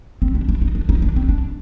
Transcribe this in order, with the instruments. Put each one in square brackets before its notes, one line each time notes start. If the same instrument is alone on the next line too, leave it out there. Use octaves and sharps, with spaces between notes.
[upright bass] C4
D4
D4
D#4
D4
D#4
D4
C4
D4